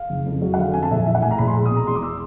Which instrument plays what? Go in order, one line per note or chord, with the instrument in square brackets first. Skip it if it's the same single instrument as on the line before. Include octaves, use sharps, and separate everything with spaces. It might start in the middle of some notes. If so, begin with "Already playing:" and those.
Already playing: [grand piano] F5
F#1
F2
F#3
F#5
D3 F5
F2 G#5
A5
A#1 E5
E3 E5
F#5
A2 G#5
A#5
A#1 B5
C6
G#3
D#6
B2 A#5
E2 C6
D6
E6